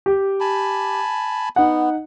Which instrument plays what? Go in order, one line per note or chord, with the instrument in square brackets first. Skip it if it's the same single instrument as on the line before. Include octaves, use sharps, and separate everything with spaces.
[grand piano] G4
[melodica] G#5 A5 B5
[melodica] B3 [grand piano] D#4 F#5